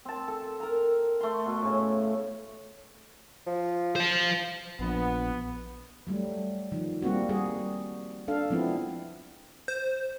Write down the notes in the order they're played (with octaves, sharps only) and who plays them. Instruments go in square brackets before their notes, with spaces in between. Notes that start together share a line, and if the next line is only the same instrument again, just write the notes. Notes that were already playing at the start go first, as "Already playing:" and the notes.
[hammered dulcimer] C4 A5
A4
A#4 A#5
A3 C6
B2
A2 C#3
[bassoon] F3
[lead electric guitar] C5 F5
[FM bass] A#1 [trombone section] B3
[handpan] F#3 G3 A3
D#3 F3
G3 A#3 C4 F#4
G3 F#4 G#4
D4 A4 F5
F3 G#3 B3 C4 E4
[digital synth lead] C5